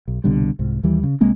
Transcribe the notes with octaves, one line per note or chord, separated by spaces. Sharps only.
B1
C2 B2 D3 G3
C2 G#2
D#2 E3 G3
C#3
C2 G#3 A#3 C4